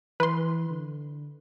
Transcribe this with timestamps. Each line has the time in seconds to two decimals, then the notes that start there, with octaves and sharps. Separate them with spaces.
0.20 E3 B4 C6
0.70 D3